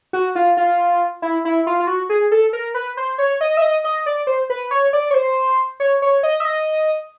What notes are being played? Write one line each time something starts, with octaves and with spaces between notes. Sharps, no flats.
F#4
F4
F4
E4
E4
F4
F4
F#4
G#4
A4
A#4
B4
C5
C#5
D#5
E5
D#5
D#5
D5
C5
B4
C#5
D5
C#5
C5
C#5
C#5
D#5
E5
D#5